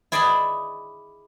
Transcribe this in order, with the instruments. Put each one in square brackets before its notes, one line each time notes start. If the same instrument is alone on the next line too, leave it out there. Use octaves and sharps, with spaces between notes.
[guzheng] E4 G#4 D5 D#5 G#5 B5